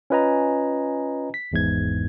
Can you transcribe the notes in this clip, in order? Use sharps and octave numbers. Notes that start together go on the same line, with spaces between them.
C#4 F4 B4 D#5 G#5 A#5
B6
G#1 E2 G#2 G#6